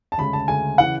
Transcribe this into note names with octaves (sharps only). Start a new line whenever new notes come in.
A5
D2 C#3 G#3 B5
A5
D2 C#3 G#3 G#5
C#3 E3 F#5